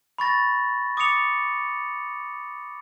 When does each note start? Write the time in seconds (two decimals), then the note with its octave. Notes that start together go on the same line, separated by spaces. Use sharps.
0.18 B5 C#6 A6 A#6
0.97 D6 D#6 A6 C#7 F7